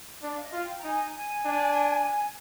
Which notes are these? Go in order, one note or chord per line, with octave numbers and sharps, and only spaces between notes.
D4 D5
F5
D#5
F4 F5
G5
A#5
D#4 G#5
G#5
D4